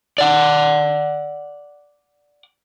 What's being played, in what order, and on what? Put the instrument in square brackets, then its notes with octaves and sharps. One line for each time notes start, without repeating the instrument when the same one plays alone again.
[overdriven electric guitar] D5 F#5